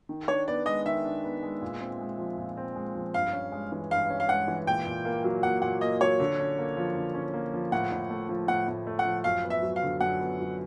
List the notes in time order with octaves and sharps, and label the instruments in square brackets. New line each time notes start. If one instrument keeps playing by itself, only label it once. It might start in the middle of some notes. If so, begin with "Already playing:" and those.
[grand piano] D#3
[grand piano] D4 [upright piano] C#5
[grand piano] B3 [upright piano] D5
[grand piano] G#3 [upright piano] D#5
[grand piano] D#3 [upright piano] E5
[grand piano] D4
B3
G#3
A#2
C4
G#3
F3
A#2
C4
G#3
F3
[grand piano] G2 [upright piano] F5
[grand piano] C#4
G#3
E3
[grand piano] G2 [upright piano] F5
[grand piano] C#4
[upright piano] F5
[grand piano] G#3 [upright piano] F#5
[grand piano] E3
[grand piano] A#2 [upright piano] G5
[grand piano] A#2
A#3
F#3
[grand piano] A#2 [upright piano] F#5
[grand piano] A#2 [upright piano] F#5
[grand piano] A#3 [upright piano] D#5
[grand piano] F#3 [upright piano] C#5
[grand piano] D3
C#4
A#3
F3
D3
C#4
A#3
F3
[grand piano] A2 [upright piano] F#5
[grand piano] A2
A3
F3
[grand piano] A2 [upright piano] F#5
[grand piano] A2
A3
[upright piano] F#5
[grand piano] F3
[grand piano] F#2 [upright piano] F5
[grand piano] B3
[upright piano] E5
[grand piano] F#3
[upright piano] F5
[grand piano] D3
[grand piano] F#2 [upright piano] F#5
[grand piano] B3
F#3